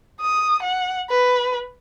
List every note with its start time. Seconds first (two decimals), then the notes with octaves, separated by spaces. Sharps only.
0.21 D#6
0.63 F#5
1.10 B4